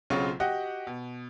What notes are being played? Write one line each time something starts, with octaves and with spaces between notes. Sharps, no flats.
B1 C#3 F#3 C4 F4 C#6
F#4 G4 D#5 F#5 G5
B2